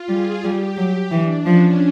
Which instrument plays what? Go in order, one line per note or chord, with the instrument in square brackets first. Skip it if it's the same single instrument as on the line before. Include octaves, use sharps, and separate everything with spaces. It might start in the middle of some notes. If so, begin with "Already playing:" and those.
Already playing: [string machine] F4
[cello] G3 [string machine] G#4
[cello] G3 [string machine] G4
[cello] F#3
[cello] E3 [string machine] D4
[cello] F3 [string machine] C#4